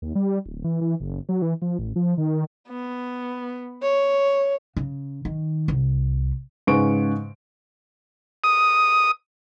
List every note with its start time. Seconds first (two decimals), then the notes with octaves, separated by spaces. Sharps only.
0.02 D#2
0.15 G3
0.46 D1
0.64 E3
0.81 E3
1.00 F#1
1.29 F#3
1.42 E3
1.62 F3
1.79 A1
1.96 F3
2.18 D#3
2.69 B3
3.83 C#5
4.77 C#3
5.25 D#3
5.68 C2
6.67 G#2 C#3 B4 C#6 D7
8.44 D#6